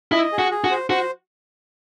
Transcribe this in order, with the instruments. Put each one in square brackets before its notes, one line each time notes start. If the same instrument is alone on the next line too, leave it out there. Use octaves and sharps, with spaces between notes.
[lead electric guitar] E4 [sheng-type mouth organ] D#5
[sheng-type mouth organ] G#4
[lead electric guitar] F#4
[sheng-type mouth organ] G#4
[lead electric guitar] F#4
[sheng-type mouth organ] C5
[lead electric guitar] F#4 [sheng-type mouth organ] C5